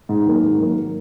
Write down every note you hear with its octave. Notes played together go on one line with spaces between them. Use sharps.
G#2
D#3 F#3 A#3
G#2
D#3 F#3 A#3